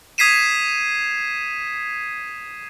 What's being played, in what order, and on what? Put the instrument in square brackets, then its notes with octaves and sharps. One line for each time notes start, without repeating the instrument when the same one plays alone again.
[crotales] D#6 G#6 B6 C7 D#7 E7